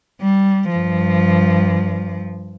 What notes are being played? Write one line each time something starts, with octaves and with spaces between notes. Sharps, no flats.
G3
G2 F3